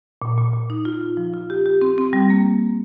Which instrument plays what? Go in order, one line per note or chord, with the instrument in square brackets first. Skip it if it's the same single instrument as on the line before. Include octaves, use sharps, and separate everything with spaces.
[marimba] A#2
A#2
A#2
D#4
F4
F4
F3
F4
G4
G4
C4
C4
G3
A#3